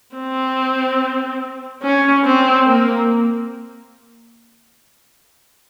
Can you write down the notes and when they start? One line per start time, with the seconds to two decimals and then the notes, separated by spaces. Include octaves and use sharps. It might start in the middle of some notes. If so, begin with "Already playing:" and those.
0.16 C4
1.83 C#4
2.25 C4
2.66 A#3